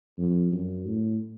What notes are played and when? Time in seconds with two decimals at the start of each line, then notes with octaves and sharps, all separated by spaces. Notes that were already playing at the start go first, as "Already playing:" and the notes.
0.18 F2
0.52 F#2
0.86 A2